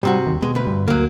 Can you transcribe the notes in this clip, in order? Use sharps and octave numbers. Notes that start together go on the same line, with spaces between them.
G#2 C3 G3 F#4
D#2
B2 G#3
D2 B4
G2
D2 F#3 A#3